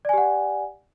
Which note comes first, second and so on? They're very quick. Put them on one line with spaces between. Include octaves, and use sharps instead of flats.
D5 G#5 G4 F#5